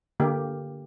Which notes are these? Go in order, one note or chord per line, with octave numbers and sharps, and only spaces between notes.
D3 A#3 G4